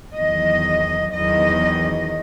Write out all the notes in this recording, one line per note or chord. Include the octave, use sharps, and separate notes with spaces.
E2 D#3 F#3 D#5
E2 D#3 F#3 D#5